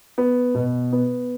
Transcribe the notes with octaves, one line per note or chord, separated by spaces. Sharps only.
B3
B2
B3